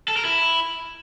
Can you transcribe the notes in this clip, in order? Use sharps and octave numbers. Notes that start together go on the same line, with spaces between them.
A4
A#4
E4